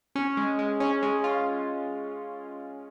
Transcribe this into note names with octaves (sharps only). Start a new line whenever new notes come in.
C#4
G#3
G#3
C#4
G#3
F4